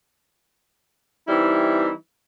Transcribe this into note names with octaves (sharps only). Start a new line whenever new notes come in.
E3 G3 C4 D#4 E4